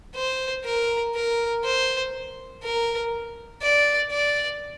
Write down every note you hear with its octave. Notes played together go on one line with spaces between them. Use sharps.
C5
A#4
A#4
C5
A#4
D5
D5